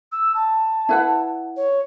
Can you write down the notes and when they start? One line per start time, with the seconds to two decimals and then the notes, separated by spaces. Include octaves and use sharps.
0.12 E6
0.34 A5
0.89 E4 B4 F#5
1.57 C#5